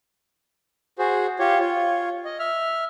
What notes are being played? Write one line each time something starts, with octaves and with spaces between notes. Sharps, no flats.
F#4 G#4 C5
F4 G4 C#5
F4 C#5
D#5
E5 F6